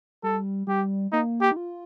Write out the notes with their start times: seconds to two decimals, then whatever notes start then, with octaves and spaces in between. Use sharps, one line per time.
0.23 G3 A4
0.67 G3 G4
1.12 A#3 D#4
1.41 G4
1.52 D#4
1.56 F4